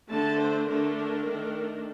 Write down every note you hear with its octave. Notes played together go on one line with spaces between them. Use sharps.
D3 A3 D4 A5
C5
D3 A3 D4 A#4
A#4
D#3 A3 D4